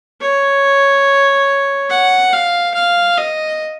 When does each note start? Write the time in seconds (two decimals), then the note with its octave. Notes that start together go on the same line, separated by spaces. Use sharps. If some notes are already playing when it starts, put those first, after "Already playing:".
0.21 C#5
1.90 F#5
2.33 F5
2.74 F5
3.18 D#5